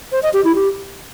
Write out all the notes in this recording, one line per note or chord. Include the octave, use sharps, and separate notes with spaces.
C5
D#5
G4
E4
G4